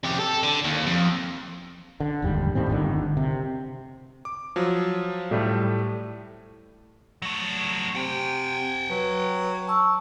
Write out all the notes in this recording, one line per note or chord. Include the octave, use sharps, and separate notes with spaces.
F2 G4
A4
D3
D#2
F2
D3
F1 D#2 G#2 G3
D#2 A2 G3 C4
G1 D3 D#3
C3
D6
F3 F#3
A2 G3 A3
F#3 A3
C3 F#5 G5
F#3 B4
A5 C#6 E6